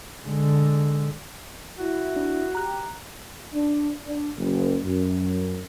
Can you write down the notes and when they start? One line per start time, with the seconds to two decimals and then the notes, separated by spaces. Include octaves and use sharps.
0.25 D3 G#3
1.78 E4 F#4
2.16 D4
2.55 G4 A#5 F#6
3.54 D4
4.06 D4
4.37 F#1
4.84 F#2